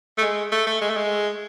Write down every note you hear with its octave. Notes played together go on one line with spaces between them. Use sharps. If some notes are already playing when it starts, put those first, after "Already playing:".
A3
G#3
A3
A3
G#3
A3
G#3